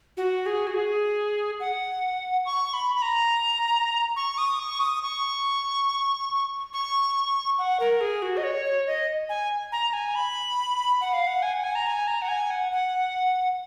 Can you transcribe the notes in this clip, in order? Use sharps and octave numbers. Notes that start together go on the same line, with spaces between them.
F#4
G#4
F#4
G#4
F#5
C#6
B5
B5
A#5
C#6
D#6
C#6
D#6
C#6
C#6
F#5
A#4
G#4
F#4
D#5
C#5
C#5
D#5
G#5
A#5
G#5
B5
F#5
F5
F#5
G#5
F#5
G#5
A#5
G#5
A#5
F#5
G#5
F#5
F#5